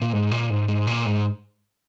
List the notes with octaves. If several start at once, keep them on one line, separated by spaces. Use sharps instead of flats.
A#2
G#2
A#2
G#2
G#2
A#2
G#2